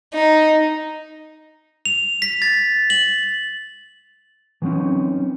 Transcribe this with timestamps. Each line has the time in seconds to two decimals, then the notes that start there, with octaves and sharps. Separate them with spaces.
0.14 D#4
1.86 F7
2.22 B6
2.42 A6
2.90 F#7
4.62 E3 F#3 G3 C4 C#4 D#4